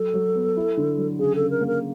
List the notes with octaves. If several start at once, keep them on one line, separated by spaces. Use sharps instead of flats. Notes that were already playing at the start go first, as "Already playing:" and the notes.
Already playing: F#3 A4
F#3
B3
E4
D3
F#3
C#3 G#4
C#3 A4
A#4
A#3
A#4